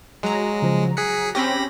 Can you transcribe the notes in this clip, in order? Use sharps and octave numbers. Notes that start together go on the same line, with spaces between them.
F#3 G#3 A#5
C#3 F3
G#4 F#6 B6 C#7
C4 C#4 G4 B5 A#6